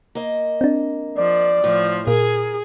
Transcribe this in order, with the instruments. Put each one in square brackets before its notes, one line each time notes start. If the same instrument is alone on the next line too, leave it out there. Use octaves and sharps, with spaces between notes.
[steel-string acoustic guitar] A#3 D#5
[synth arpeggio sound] C4 D4
[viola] F3 [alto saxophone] D5
[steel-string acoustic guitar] A2 [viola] F3
[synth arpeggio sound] A#2 [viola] G#4 [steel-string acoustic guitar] A#4